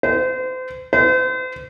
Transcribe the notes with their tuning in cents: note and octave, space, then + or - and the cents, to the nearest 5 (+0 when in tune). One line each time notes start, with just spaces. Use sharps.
C5 -35
C5 -40